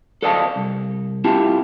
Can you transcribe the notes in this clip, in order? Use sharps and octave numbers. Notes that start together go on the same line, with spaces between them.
A4 C5 D5 D#5 F5 A5
C2
C4 E4 F4 G4 A5